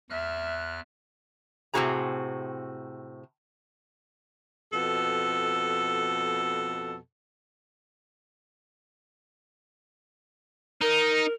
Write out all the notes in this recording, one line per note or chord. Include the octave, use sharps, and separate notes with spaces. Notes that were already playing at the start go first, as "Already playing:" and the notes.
E2 E5 F6 F#6
A2 C3 C4 F#4 G#4 A#5
F2 B2 A4
D#4 A#4